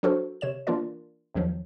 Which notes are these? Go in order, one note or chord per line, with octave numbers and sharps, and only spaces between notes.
F#3 D4 F#4 A4 A#4 C5
C3 C#5 E7
E3 A#3 D4 F4 A#4 D5
A#1 E2 D#3 F3 F#3